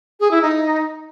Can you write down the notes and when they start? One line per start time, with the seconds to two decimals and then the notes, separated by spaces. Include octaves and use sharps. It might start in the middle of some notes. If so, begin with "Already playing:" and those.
0.20 G#4
0.31 E4
0.42 D#4